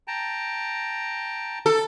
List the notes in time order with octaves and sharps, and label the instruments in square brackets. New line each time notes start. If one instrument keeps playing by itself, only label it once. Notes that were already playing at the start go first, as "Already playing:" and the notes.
[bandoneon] G5 A5 A#5
[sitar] A4